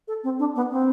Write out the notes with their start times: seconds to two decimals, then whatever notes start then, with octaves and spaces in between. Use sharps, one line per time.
0.08 A4
0.24 C4
0.39 D4
0.55 B3
0.71 C4